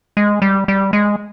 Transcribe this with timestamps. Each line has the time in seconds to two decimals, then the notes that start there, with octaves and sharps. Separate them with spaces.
0.17 G#3
0.42 G3
0.68 G3
0.93 G#3